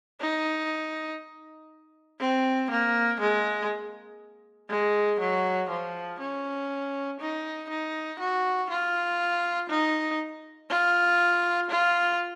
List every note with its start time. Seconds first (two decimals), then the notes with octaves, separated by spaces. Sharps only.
0.21 D#4
2.20 C4
2.70 A#3
3.20 G#3
4.70 G#3
5.20 F#3
5.70 F3
6.20 C#4
7.20 D#4
7.69 D#4
8.19 F#4
8.70 F4
9.69 D#4
10.70 F4
11.70 F4